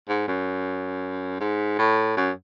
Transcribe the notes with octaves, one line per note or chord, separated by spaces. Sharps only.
G#2
F#2
G#2
A2
F#2